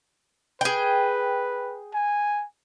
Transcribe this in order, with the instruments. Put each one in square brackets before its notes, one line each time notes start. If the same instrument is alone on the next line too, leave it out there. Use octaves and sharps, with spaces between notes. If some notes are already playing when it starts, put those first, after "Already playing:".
[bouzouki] G#4 G5 [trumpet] B4
[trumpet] G#5